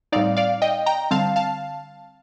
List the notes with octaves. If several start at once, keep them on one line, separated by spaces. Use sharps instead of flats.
A2 G3 C4 D#4 D5 F5
D5 F5
D#5 G5
G5 A#5
D3 G3 C4 F5 A5
F5 A5